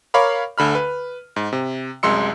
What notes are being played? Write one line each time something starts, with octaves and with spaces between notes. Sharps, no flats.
A#4 C#5 F5 B5 D6
D2 D3 B5 F6
B4
G#2
C3
C2 F#2 G#3 C6 E6 C#7